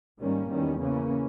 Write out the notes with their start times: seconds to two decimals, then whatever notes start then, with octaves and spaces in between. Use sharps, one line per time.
0.19 G#2 D#3 G3 A#3 C#4
0.50 E2 D#3 G3 C#4
0.81 C#3 E3 A#3 C#4